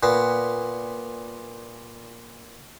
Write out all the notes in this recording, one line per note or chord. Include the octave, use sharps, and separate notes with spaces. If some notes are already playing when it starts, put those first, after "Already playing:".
A#2 B3